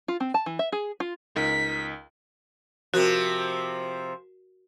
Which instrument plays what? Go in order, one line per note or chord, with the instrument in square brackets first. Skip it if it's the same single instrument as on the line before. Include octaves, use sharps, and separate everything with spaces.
[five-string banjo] F4
C4
A5
E3
E5
G#4
F4
[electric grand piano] C#2 D#4 A#4 [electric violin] B6
[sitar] C3 F3 [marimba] F#4 A#4